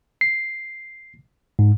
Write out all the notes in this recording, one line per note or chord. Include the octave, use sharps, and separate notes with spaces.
C7
G#2